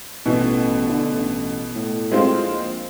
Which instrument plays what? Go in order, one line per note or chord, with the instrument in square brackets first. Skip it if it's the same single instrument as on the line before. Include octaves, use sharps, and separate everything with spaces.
[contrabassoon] A1 [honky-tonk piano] B2 E3
[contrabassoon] D3
A1
A2
[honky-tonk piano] G#3 C4 F4
[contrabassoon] A#1